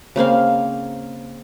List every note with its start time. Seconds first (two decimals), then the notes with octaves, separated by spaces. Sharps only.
0.16 C#3 A#3 C4 F5